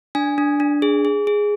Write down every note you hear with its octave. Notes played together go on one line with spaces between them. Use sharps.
D4 G#5
D4
D4
G#4
G#4
G#4